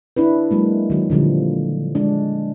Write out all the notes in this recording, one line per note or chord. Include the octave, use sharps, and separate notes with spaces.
D4 E4 B4
F#3 G#3 A#3
D#3 F#3
A#2 D3 F3 G3
G#3 D4